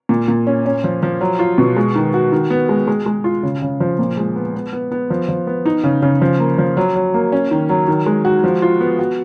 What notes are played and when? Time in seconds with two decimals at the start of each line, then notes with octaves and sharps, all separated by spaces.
0.09 A#2
0.28 A#2
0.47 C#4
0.66 C#4
0.84 F3
1.03 F3
1.21 F#3
1.39 F4
1.58 B2
1.77 G#3
1.96 D#3
2.14 F#4
2.32 D#3
2.50 B3
2.69 G#3
2.88 G#3
3.06 G#3
3.24 F4
3.43 C#3
3.62 C#3
3.80 F3
3.99 A#2
4.17 G#3
4.36 B3
4.55 B3
4.73 B3
4.91 B3
5.10 F3
5.29 F3
5.47 B3
5.66 D#4
5.84 C#3
6.02 C#3
6.21 F3
6.40 A#3
6.58 F3
6.77 F#3
6.95 F#3
7.14 A#3
7.32 C#4
7.51 D#3
7.69 F#3
7.88 D#3
8.06 G#3
8.25 F#4
8.44 F3
8.62 F4
8.81 B3
8.99 F#4